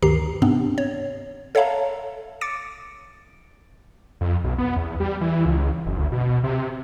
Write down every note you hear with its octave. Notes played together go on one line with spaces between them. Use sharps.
D2 G2 D#3 G4 A#5 C7
G#2 C3 B3 C4 D4
C#5
A4 C#5 E5 F5 A5 A#5
D6 A6 C#7 D7
F2
B1
B3
E2
G3
E3
C#2
F#1
D2
B2
C3